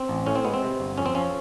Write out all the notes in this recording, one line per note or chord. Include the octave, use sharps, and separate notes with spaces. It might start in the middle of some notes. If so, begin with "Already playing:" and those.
Already playing: C4
A1
A2 C#4
C4
G#3 B3
C4
C3
G1
F2 C#4
C4
F3 C#4